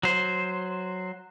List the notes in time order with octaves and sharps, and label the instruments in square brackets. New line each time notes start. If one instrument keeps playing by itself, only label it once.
[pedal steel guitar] F#3 C5